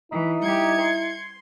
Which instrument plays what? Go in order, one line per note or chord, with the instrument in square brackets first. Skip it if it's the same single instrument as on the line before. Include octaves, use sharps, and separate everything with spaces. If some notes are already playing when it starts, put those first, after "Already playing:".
[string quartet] E3 [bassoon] D#4 [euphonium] E4
[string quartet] G3 G4 [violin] G#6 C#7
[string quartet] C6